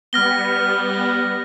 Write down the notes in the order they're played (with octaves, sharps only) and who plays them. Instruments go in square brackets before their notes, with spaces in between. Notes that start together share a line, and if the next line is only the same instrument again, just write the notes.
[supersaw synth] G3 B3 [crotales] F6 A#6 G7